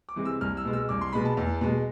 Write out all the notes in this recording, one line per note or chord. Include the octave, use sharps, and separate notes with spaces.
D6
C3 E3 G#3
E6
C2 F6
E6
B2 G#3
E6
C2 D6
C6
B2 G#3 B5
A5
E2
B2 G#3